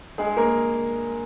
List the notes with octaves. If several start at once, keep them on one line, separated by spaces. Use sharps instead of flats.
G2 G#3 G#4
A#3 A#4